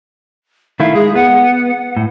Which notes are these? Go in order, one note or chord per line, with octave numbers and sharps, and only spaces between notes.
D#3 A3 E4 F5
G#3 G#4
B3 F#5
A2